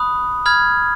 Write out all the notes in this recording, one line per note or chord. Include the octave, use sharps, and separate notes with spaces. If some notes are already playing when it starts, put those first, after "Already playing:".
Already playing: B5 D#6 F#6
B5 F6 G#6